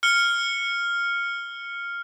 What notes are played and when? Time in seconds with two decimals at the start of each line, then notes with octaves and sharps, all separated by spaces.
0.03 F6 C#7 G7